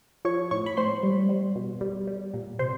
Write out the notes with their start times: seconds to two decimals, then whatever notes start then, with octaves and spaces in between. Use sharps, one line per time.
0.25 F3 C#5 C#6
0.51 A2 C#5 C#6
0.66 B5
0.77 A2 C5 C6
1.03 G3
1.29 G3
1.55 B2
1.81 G3
2.08 G3
2.33 A#2
2.59 C3 C5 C6